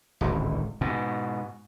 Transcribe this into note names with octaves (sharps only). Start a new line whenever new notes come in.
D1 G#1 C#2
G#2 B2